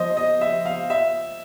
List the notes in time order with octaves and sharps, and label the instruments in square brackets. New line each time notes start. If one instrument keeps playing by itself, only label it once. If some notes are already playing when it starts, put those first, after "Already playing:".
Already playing: [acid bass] F3 [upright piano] C5 D#5
[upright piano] D#5
E5
F5
E5